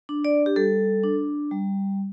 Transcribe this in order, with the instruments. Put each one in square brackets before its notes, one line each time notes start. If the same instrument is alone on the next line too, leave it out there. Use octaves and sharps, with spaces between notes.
[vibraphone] D4
D5
G4
G3 A4
D4
G3